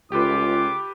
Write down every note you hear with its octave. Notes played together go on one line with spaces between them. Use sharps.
C#2 F4 G4 A4 B4 D6